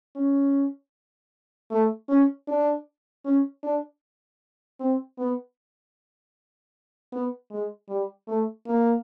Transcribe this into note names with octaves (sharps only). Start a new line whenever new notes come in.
C#4
A3
C#4
D4
C#4
D4
C4
B3
B3
G#3
G3
A3
A#3